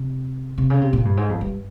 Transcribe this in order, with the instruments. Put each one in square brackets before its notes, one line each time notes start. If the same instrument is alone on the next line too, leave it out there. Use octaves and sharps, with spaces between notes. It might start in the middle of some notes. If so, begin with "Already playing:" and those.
Already playing: [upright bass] C3
C3
C#3
C3
A#2
G2
G#2
F2
G2